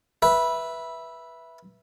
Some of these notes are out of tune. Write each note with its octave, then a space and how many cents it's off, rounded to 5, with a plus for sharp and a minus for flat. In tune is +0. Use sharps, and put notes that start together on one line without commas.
B4 -15 E5 +0